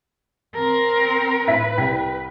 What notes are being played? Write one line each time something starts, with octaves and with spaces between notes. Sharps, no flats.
C4 A#4
A2 B4 E5 B6
C2 G5 B6